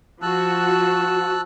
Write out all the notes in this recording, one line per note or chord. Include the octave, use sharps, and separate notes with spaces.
F3 F#4 A5 E6 F#6